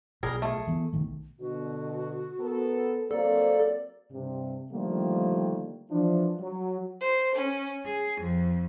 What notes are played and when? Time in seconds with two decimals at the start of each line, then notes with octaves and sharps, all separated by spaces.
0.23 B1 G3 G#4 A#4
0.42 A3 G#4
0.67 E3 B3
0.93 B1 D#3 A3
1.40 B2 D3 F#4
2.40 B3 A4 A#4
3.11 F#3 A#3 C4 A4 D5
4.11 G2 C3
4.73 D3 D#3 F3 G3 A3 A#3
5.91 E3 F3 D4
6.40 F#3
7.01 C5
7.34 C#4
7.85 G#4
8.21 F2